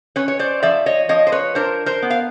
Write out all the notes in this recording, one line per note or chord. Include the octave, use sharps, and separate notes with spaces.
C#4 B4 C#5
C#5
C5 D5
F3 D5 E5
C#5 D#5
F3 C#5 D#5
C5
B4 C#5
D4 A#4 C5
A#4 C5
B3
F5